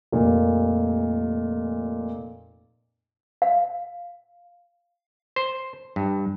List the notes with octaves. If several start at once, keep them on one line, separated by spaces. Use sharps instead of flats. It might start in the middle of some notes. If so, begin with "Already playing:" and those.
F1 A#2
F5
C5
G2